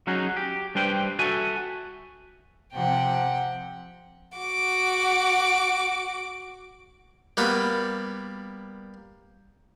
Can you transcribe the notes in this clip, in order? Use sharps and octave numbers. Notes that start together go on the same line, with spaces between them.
F#3 C#4 D#4 F#4 G#4
G4
G3 D4 B4 C5 G5
F#4 A4 E5 G#5
C3 F3 F#5 G5
F#4 D6
G3 A#3 B3 F#4 B4